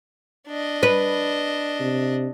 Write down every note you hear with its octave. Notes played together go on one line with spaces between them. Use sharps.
D4 D#5
B4
C3